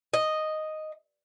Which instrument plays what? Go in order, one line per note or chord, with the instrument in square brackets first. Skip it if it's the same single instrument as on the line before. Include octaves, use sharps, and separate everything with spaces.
[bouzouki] D#5